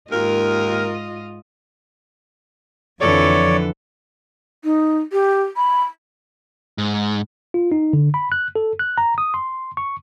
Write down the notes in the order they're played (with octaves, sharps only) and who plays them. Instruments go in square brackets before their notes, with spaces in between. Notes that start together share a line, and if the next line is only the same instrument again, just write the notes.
[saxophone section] D#2 A#4 [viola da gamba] G#2 F4 D#5
[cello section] F2 F3 [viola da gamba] D3 E3 A4 [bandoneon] C#5 D5
[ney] D#4
G4
B5
[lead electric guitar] G#2
[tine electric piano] F4
D#4
D3
B5
F#6
A4
F#6
A#5
D#6
C6
C#6